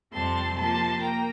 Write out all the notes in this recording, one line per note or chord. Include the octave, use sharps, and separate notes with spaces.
F2 C3 G3 C4 A5 C6
C3 F3 A#3 A5 C6
A#3 G5 A#5